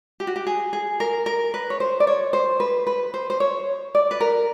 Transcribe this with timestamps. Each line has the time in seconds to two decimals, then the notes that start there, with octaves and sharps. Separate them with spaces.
0.20 G4
0.27 F#4
0.36 G4
0.47 G#4
0.73 G#4
1.00 A#4
1.26 A#4
1.54 B4
1.70 C#5
1.80 C5
2.00 D5
2.07 C#5
2.33 C5
2.60 B4
2.87 B4
3.14 C5
3.30 C5
3.40 C#5
3.95 D5
4.11 B4
4.20 A#4